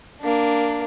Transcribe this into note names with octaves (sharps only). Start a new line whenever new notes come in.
A#3 D4